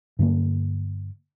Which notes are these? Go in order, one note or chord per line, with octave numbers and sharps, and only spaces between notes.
G2 D3 A#3